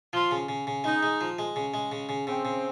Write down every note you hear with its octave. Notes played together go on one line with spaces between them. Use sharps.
F3 F4
C#3
C#3
C#3
G#3 D#4
G#3
F3
G#3
C#3
G#3
C#3
C#3
C#3 C4
C#3